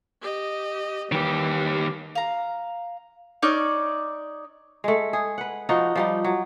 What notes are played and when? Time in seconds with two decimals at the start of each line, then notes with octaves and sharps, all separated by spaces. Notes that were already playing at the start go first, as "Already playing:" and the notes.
0.22 G4 D#5
1.12 D#3 E3 G3 G4
2.15 F5 A#5
3.42 D#4 C#5 D5 F6
4.84 G#3 A3
5.13 G#4
5.38 B4 F#5
5.69 F3 D#4 F#4
5.96 F3 G3 D#4
6.25 F#3